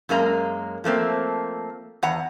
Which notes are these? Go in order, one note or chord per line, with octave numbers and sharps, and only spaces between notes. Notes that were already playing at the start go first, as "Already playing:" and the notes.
F#2 G#3 A#3 A#5
F3 A3 A#3 C4
E2 F#5 A#5